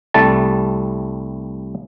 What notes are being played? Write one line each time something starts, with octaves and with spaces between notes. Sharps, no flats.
C2 G3 A3 A5